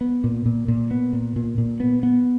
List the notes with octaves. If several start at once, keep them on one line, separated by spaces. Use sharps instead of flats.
B3
A#2
A#2
A#2
B3
A#2
A#2
A#2
B3
B3